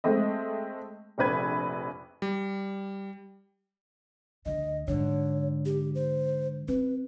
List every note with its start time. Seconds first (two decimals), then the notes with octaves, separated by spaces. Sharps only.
0.04 G#3 A3 C4 D#5
1.18 F1 A#1 B4 G#6
2.22 G3
4.46 D2 D3 D#5
4.88 G#2 D3 C#5
5.65 G4
5.95 C5
6.68 C4 B4